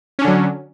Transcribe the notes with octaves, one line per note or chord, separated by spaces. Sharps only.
D3 F#3 C#4 D4